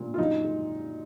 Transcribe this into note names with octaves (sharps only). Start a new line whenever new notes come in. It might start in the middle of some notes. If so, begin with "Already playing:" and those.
Already playing: A#2
F4
F#2 D#4
G#3